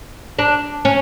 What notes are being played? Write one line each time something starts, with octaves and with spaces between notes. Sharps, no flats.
D4
C#4